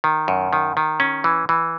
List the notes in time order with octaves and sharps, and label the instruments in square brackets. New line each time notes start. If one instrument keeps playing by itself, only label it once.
[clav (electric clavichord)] D#3
F#2
D#3
D#3
C#4
E3
E3